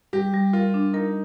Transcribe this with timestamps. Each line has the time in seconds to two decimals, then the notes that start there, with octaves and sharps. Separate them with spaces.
0.13 G3 G4
0.34 G3
0.53 F4 A#4
0.74 D4
0.93 D#4 A#4